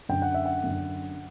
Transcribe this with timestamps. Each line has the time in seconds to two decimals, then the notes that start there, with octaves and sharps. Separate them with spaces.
0.09 F#2 D3 G5
0.22 F#5
0.34 E5
0.46 F#5
0.63 F#2 D3